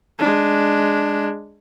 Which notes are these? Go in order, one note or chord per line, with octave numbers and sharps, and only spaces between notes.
G#3 D4